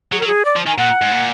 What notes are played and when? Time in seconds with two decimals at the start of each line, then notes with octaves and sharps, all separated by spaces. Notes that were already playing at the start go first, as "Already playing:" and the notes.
0.12 F#3 G#4
0.19 A#4
0.23 F#3
0.27 G#4
0.45 D5
0.56 F3
0.67 D#3 G#5
0.78 A#2 F#5
1.01 G#2
1.11 A#2